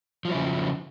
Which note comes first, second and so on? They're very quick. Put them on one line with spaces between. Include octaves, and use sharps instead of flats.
F3 F#3 E4 C#3